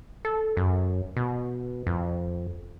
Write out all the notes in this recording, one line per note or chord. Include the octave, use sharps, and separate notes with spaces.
A4
F#2
B2
F2